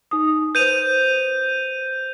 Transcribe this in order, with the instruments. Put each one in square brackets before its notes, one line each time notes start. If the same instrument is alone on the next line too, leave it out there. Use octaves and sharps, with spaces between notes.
[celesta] D#4 D#6
[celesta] B4 C5 [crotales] G6 D#7 F7